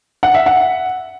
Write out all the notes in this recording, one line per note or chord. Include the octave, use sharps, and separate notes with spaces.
F#5
E5
F#5